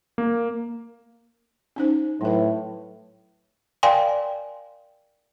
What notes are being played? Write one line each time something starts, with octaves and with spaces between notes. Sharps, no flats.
A#3
C#4 D#4 C5
A2 F#3 B4
A#4 D5 F5 G5 G#5 C6